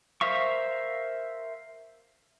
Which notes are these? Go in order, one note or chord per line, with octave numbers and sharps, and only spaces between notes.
A#4 C5 E5 F5 C#6